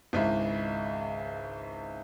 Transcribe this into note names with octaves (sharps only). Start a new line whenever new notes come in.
G#1 C#2 E4